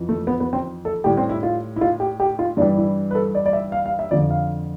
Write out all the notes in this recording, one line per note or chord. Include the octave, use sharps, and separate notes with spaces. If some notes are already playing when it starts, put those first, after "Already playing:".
Already playing: F2 E3
A3
B3
B3
C4
A4
A2 G3 G4
C4
E4
F4
E4
F4
G4
G4
F4
G2 E3 G3 D4
E4
B4
A4
D5
D5
E5
F5
F5
E5
F2 D3 F3 D5
F5